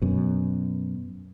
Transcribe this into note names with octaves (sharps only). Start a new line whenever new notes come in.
F#2 B2